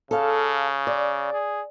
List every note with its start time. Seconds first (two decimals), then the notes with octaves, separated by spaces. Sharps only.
0.11 C#3 A4 F5
0.87 D5
1.33 G#4